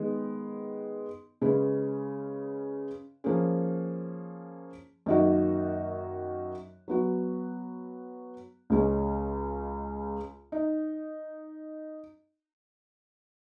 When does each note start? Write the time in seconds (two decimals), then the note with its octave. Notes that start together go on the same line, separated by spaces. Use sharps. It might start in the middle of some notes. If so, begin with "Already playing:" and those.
Already playing: D#3 G#3 B3
1.41 C#3 G#3 C#4 G#4 B4
3.24 F3 A#3 C#4 G#4
5.06 F#2 D#3 A#3 D#4 F#4
6.88 F#3 B3 F#4
8.70 C#2 C#3 G#3 C#4
10.52 D#4